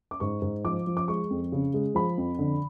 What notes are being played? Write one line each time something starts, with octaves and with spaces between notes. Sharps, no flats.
D6
G#2 C#6
G#2
F3 D6
F3
D6
G#3 C#6
F2
C#3
G#3
F3 B5
F2
D3